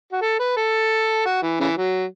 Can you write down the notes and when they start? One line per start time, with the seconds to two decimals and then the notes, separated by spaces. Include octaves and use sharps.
0.12 F#4
0.22 A4
0.39 B4
0.57 A4
1.26 F#4
1.42 E3
1.60 C#3 E3
1.77 F#3